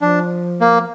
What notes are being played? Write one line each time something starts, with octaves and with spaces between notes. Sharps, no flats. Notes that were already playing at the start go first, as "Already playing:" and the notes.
F3 D4
A#3